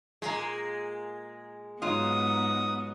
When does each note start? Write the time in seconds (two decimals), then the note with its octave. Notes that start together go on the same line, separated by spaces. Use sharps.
0.22 A#2 G#3 A#3 A#5
1.82 G#2 F#3 B3 D#4 F4 D#6